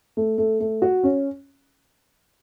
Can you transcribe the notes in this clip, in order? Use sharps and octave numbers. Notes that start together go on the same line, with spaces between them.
A3
A3
A3
F#4
C#4